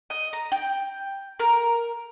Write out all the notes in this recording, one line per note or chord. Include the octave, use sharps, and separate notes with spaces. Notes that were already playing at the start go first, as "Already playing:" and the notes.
D#5
A#5
G5
A#4